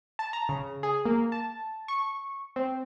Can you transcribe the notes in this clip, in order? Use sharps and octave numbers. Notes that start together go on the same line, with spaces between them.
A5
A#5
C#3
G#4
A#3
A5
C#6
C4